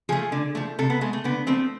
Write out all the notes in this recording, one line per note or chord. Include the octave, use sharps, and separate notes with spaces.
F3 A3 G#4
D3
F3 A3
C3 A4
B3
G#3 A3
A3
D3 B3
F3 A3 C4